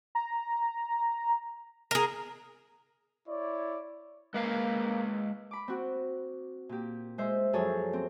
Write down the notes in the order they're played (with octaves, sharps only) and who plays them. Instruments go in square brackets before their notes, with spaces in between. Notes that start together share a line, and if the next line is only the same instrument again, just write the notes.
[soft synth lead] A#5
[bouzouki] G#4 A#4
[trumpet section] E4 C#5 D5
[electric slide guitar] G#3 B4 F5 [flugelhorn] A#3
[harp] B5 D6
C4 F#4
A#2 G4
G#3 C5 E5
F#2 F3 G#4 A4 C#5
C4